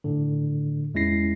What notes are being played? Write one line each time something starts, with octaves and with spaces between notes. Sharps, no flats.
A2 D3
E2 G#3 C#4 E4 A#6 C7